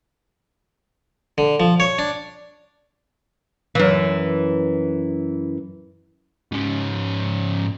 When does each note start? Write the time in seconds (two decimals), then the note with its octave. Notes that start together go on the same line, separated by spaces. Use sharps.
1.38 D3
1.60 F3
1.80 C#5
1.99 D4
3.75 F#2 E3
6.52 G#2 C#4